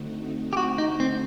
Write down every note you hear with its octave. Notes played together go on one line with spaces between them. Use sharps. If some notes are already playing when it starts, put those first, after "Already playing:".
Already playing: D3 A3 C4 D#4 F#4
G4
F#4
D#4
C4